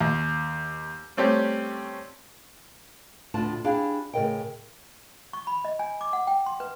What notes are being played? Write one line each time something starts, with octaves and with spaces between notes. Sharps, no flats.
D#2
G3 A3 C4 C#4 G4
D2 A2 D4 F4 A5
D4 E4 G4 G#4 F5 G5
A2 C#3 A3 A#4 D#5 G5
C#6
B5
D#5
G#5
D6
F#5
G5
C6
B4